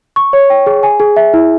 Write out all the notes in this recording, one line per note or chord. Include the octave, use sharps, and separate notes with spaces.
C#6
C#5
G5
G#4
G#5
G#4
E5
E4